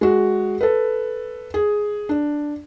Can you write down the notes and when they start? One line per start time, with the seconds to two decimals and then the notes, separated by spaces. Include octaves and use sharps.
0.01 G#3 F#4
0.61 A4 B4
1.54 G#4
2.09 D4